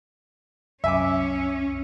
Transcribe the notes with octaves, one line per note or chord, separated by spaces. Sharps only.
C2 F#2 C#4 E5 G#5 D6